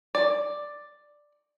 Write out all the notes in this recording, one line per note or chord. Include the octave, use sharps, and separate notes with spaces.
D5